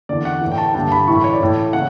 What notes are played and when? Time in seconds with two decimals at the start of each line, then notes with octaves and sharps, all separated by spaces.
0.09 E2 D3 D5
0.25 F#5
0.41 A2 E3
0.52 G5
0.58 A5
0.66 G5
0.75 G2 D3 A5
0.92 B5
1.08 A2 E3 C#6
1.15 B5
1.24 C#5
1.33 D5
1.41 A2 E3
1.73 C#3 F#5